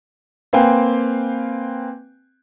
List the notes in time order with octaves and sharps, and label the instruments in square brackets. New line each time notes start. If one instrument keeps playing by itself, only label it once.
[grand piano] A#3 C4 B4 F5 G5 G#5